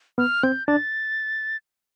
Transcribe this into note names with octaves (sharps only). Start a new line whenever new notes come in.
B3 F6
C4 G6
D4 A6